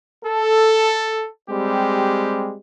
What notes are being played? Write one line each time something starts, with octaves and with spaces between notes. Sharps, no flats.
A4
G3 G#3 C4 G4